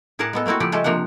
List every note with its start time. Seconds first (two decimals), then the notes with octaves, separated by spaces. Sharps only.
0.19 A2 G#4 A#4 D5 F#5 A5
0.33 G#3 B3 A4
0.46 A3 A#3 C4 E4 F#4
0.60 C#3 F3 G4 A4 D5
0.72 G#3 A3 G4 A4
0.84 C3 F3 A#3 D4 F#5